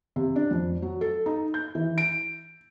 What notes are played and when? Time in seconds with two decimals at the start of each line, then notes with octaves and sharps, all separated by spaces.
0.16 C3
0.36 D4
0.51 F2
0.82 F#3
1.01 A4
1.26 D#4
1.54 G6
1.75 E3
1.98 D7